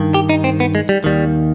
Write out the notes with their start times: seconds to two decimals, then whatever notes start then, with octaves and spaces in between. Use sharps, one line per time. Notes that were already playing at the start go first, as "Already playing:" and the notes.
Already playing: G2 D#3
0.14 G4
0.29 D#4
0.44 C4
0.60 B3
0.75 G#3
0.89 G3
1.04 D#2 D#3 G3